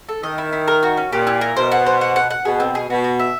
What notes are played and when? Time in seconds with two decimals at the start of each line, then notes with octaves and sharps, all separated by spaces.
0.09 A4
0.23 D#3 D#5
0.38 E4
0.52 E4
0.68 A#4
0.83 F#4
0.97 C#4
1.12 A#2 G4
1.27 E4
1.41 A#4
1.56 B2 C5
1.72 F#5
1.86 C5
2.01 F#5
2.16 F#5
2.30 F#5
2.45 B2 G#4
2.60 C4
2.75 G#4
2.90 B2 F#4
3.04 F#4
3.19 E5